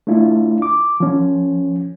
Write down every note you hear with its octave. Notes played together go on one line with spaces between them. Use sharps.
A3 D4 E4 F4
D6
F3 C#4